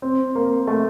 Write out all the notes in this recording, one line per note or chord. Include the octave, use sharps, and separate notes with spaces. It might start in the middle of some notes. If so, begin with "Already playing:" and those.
C4
A#3
A3